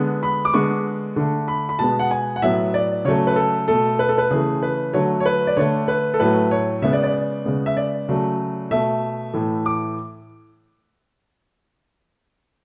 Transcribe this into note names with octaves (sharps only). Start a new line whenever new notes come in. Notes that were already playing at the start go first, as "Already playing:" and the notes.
Already playing: D3 G#3 B3
B5
D6
D3 G#3 B3 C#6
D3 A3
B5
B5
B2 G#3 B3 A5
F#5
G#5
F#5
A2 F#3 B3 E5
D5
C#3 F#3 A3 C#5
B4
A4
B2 A3 A4
B4
A4
B4
C#3 E3 A3 G#4
B4
D3 F#3 A3 C#5
C#5
B4
D5
D3 A3 C#5
B4
A4
A2 F#3 A3 B4
C#5
C#3 G#3 B3 E5
D5
D5
C#3 G#3 B3
E5
D5
C#3 F#3 A3
B2 A3 E5
A2 E3 A3
D6